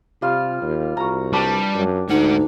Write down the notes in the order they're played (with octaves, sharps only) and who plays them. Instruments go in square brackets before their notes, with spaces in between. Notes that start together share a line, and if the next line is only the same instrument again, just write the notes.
[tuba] C3 [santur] G3 F4 F5
[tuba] D#2
[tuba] C2 [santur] F#4 A#5
[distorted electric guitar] G3 [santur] D4 G4 B4
[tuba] F#2
[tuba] D2 [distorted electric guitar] G#2 F#5 [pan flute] D#4